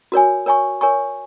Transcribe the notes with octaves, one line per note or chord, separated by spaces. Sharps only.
F#4 A#4 C#5 G#5
A#4 C#5 G#5 C#6
A#4 C#5 G#5 C#6